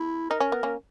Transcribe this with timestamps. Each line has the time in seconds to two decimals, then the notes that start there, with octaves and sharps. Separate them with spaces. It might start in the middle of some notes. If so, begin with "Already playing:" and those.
Already playing: E4
0.30 D#4 A#4
0.40 C#4
0.52 B3
0.63 A#3 C#4